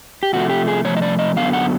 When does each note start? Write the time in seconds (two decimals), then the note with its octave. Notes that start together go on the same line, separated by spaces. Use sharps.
0.23 G4
0.33 C3 F3 A3 F#4
0.50 G4
0.68 G#4
0.84 C3 F3 A3 C#5
0.97 D#5
1.02 D5
1.19 D#5
1.36 F#2 D3 F#3 B3 F5
1.53 F#5